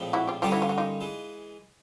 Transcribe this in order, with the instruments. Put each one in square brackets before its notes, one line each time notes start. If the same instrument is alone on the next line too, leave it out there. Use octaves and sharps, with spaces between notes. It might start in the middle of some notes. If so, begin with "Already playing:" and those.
Already playing: [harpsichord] A#1 A2 F3 G#3 C4
[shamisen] E4 F#4
F4 G4
[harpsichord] G2 D3 G3 A#3 C#4 [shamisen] F4 G4
[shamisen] E4 F#4
F4
F#4
D#4 F4
[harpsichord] E3 G#3